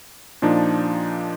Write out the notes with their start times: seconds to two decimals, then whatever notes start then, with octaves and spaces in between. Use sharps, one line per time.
0.42 A#2 F3 D4 D#4